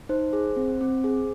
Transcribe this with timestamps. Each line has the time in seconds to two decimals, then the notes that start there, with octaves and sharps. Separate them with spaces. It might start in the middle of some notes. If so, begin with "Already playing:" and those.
0.09 D#4 C5
0.33 G#4
0.57 C4
0.81 C4
1.04 G#4